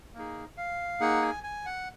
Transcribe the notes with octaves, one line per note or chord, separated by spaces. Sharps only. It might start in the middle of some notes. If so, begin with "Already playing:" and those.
A#3 D#4 G#4
F5
A#3 D#4 G#4 F#5
G#5
G#5
F#5